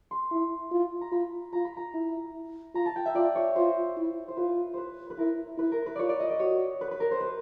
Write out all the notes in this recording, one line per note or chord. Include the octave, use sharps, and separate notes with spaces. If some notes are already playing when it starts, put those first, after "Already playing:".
C6
E4
F4
A#5
F4 B5
F4 A#5
B5
A#5
E4
F4 A#5
A5
G5
E5
F4 D5
C#5
F4 C5
E4
C5
F4 B4
B4 C5
B4
E4 A#4
E4 B4
A#4
B4
F4 C#5 D5
D5
D#5
D5
F#4 C#5
B4
B4
A#4
C5
B4